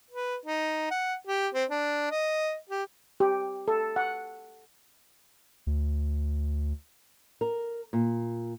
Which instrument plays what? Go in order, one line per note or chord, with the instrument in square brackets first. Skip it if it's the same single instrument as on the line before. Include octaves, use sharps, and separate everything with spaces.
[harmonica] B4
D#4
F#5
G4
C4
D4
D#5
G4
[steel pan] G4
A4
F#5
[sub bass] D2
[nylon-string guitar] A#4
A#2